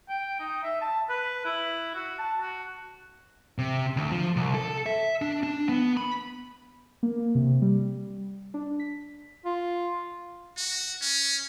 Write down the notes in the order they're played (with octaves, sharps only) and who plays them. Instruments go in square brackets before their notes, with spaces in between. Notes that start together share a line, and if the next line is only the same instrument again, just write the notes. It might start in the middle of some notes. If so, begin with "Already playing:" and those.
[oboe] G5
D#4
E5
A5
B4
E4
F#4
A5
F#4
[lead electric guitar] C3
D2
F3
C2
A4
E5
D4
D4
B3
B5
[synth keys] A#3
C3
G3
D4
B6
[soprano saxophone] F4
[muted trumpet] F#4
C#4